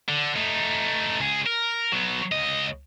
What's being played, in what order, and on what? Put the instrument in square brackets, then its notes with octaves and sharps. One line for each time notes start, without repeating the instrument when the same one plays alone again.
[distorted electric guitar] D3
A3 D#4
C#2 G#4
A#4
F#3 B3
C#2 D#5